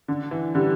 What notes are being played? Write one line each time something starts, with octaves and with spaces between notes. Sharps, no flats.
D3
E3
D3 G3